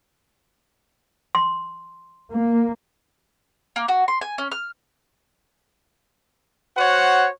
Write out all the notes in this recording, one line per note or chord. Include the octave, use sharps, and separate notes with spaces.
C6
A#3
A#3
F#4
C6
G#5
C#4
F6
F#4 C5 C#5 F#5